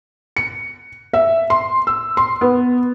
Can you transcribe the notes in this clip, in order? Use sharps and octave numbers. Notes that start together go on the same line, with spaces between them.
C#7
E5
C6
E6
C6
B3